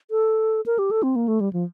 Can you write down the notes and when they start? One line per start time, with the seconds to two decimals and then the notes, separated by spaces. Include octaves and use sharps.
0.11 A4
0.66 A#4
0.79 G4
0.91 A4
1.03 C4
1.16 A#3
1.28 A3
1.41 G3
1.53 F3